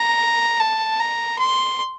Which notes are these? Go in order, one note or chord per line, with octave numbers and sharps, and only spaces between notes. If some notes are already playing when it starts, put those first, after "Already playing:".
Already playing: A#5
A5
A#5
C6